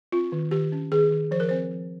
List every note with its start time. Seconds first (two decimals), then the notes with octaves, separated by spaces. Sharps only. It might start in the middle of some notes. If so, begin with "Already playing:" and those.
0.12 C4 F4
0.32 D#3
0.51 D#3 G4
0.72 C#4
0.92 D#3 G#4
1.11 D#3
1.31 F3 C5
1.40 A#4
1.49 C4 C5
1.71 F3